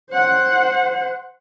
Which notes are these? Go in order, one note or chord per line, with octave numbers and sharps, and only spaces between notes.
C5 F#5